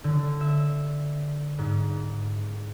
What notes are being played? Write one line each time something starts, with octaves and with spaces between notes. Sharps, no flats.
D3
E5
G#2